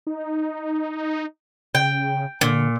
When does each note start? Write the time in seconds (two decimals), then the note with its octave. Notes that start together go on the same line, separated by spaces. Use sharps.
0.07 D#4
1.75 C#3 G5
2.41 A#2 D3